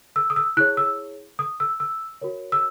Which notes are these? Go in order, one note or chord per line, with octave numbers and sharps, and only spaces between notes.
E6
D#6
E6
E4 G#4 C#5 F#6
E6
D#6
E6
E6
F#4 A#4 C#5
E6